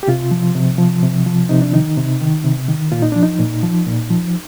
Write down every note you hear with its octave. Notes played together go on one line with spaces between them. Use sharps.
G4
C3 F4
F3
C3
F3
C3
F3
C3 D#4
D4
D#3 D#4
C3
D#3
C3
D#3
A#2 F4
D#4
F3 D4
D#4
A#2
F3
A#2
F3